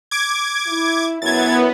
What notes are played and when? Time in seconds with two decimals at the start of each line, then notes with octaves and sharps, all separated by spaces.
0.11 D6 G#6
0.67 E4
1.22 F#2 B3 E4 G#6 A6